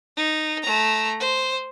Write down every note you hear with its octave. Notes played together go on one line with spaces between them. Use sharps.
D#4
A3 A#5
C5